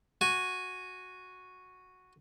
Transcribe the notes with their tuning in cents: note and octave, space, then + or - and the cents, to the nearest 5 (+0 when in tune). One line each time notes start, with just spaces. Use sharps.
F#4 -5 G#5 +0